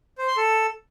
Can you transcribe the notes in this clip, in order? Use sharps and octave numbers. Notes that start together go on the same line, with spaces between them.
C5
C6
A4